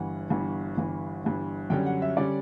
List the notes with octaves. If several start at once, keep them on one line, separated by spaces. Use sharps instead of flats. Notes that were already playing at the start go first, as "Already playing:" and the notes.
Already playing: G1 G2 E3 F#5
G1 G2 E3
G1 G2 E3
G1 G2 E3
F#2 D3 G3 C#4 G5
F#5
E5
D3 G3 C#4 D5